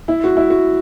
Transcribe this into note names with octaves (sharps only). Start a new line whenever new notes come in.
E4
F#4
E4
F#4